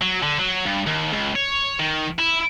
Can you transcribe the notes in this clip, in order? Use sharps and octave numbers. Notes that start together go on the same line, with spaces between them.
F#3
D3
F#3
G2
D#2
C#2
C#5
D#3
E4